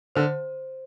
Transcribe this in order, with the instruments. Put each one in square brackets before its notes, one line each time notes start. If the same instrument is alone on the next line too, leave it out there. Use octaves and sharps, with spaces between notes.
[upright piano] D3 [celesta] C5